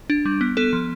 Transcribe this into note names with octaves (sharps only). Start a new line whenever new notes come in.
D4
G3
B3
B3 A4
F3